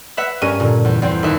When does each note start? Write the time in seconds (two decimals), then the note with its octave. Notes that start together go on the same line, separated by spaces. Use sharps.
0.17 B4 E5 F#5
0.42 G2 C#4 A#4 D#7
0.60 A#2 D3
0.85 E2
1.02 E2 C4
1.23 D#2 E5